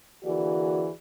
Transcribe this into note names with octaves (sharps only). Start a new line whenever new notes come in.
D3 E3 A#3 F#4 G#4 D5